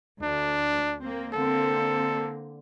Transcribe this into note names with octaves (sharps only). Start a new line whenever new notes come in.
D2 D4
A#3 C4
D3 A#3 C4 A4